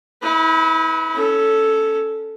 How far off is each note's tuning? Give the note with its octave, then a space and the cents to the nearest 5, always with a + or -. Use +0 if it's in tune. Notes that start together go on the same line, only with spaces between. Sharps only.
E4 -40 B4 +0
C#4 +10 A4 +0